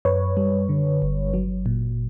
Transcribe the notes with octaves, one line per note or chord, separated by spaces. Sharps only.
F#2 B4 C#5
G3
D3
G1
F#3
A#2